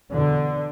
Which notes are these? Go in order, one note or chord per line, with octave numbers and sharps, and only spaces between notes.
E2 B2 D3